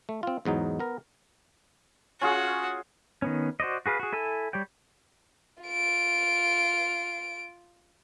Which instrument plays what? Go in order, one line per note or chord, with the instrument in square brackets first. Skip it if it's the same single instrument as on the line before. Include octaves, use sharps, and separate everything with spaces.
[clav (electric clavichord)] A3
C4 F4
E2 G#2 F#3 D#4
B3 A#4
[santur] C#4 F4 G#4 [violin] F#4
[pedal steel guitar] D#3 B3 C#4
F#4 C5 D5 D#5
F#4 G#4 B4 F5
F#4 G#4
E4 A4 G#5 E6
G3 C#5 D5 G5
[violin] F4 D7